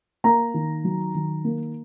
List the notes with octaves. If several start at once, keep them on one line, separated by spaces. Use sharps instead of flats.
A#3 A#5
D#3
F#3
D#3
A#3